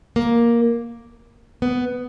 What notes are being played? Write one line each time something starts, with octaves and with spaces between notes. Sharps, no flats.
A#3
B3